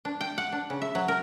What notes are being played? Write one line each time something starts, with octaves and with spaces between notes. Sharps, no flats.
D4
G5
F#5
D4
C#3
E5
F#3
A#4